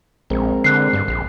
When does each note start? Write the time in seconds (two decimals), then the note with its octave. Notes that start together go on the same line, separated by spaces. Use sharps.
0.30 A#1 G#3 C4 A#4
0.64 D3 F#6 C7
0.93 G2
1.08 A#1